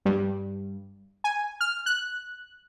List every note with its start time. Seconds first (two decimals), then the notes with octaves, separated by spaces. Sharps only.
0.06 G2
1.24 G#5
1.61 F6
1.86 F#6